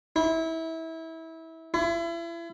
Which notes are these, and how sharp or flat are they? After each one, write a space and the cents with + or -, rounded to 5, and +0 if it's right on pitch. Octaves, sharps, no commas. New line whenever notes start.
E4 -25
E4 +35